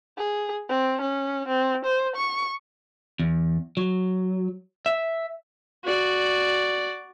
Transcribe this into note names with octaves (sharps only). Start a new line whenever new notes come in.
G#4
C4
C#4
C4
C5
C#6
E2
F#3
E5
F#4 D5